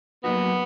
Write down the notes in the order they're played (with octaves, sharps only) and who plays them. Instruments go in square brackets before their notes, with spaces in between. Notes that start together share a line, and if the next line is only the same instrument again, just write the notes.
[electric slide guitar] F#3 A#3 D#4 F#4 [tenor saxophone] B3